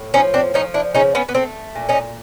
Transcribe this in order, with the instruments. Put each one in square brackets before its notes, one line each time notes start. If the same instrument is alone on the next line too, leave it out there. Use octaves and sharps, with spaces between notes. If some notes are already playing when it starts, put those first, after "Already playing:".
Already playing: [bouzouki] A2
F3 C#4 D#4
C4 D4
F3 C#4 D#4
D4 E4
C#3 C#4 D#4
B3 C#4
B3
A3 C4
A#2
C#4 D#4